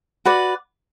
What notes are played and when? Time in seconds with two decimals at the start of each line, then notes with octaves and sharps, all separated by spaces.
0.25 F#4 B4 D5